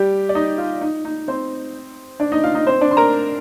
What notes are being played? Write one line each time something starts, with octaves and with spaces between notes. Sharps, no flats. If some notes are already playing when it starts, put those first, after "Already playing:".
Already playing: G3 G4
D5
D#4 D#5
F4
D#4
D#4
C4 C5
D4 D5
D#4 D#5
F4 F5
D#4 D#5
C4 C5
D4 D5
C6
A#4 A#5